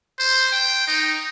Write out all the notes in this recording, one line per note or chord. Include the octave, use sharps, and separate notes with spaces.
C5
G5
D#4